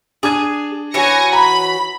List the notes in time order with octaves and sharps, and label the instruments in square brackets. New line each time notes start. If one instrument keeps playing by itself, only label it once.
[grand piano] D4 D#6 G#6 [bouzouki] G#4
[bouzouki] E3 F#4 C#5 [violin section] G#5 A#6 C#7
[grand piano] A#5 [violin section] B5